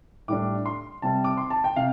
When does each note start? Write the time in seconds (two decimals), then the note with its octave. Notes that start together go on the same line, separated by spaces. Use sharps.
0.28 A2 G3 D4 D6
0.66 C6
1.02 C3 G3 C4 A5
1.24 D6
1.37 C6
1.50 A5
1.64 G5
1.76 C3 F5